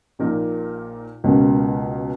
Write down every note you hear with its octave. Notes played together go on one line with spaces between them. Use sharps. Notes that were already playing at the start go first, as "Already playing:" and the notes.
A#1 A#2 A#3 D#4 A#4
C#2 B2 A#3 C#4